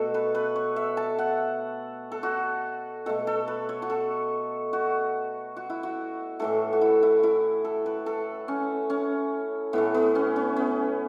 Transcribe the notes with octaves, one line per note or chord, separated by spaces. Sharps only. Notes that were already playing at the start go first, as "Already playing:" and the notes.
Already playing: B2 A3 F#4 A4
B4
B4
C#5
E5
A5
F#5
A4
F#4
B2 A3 A4
A4
B4
C#5
F#4
A4
F#4
F#4
E4
F#4
A2 E3 A3 A4
F#4
E4
E4
E4
A4
B4
A4
C#4
C#4
A2 E3 A3 B3
B3
C#4
C#4
B3